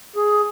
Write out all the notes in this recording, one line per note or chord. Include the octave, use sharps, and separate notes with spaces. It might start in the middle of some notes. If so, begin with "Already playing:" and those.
G#4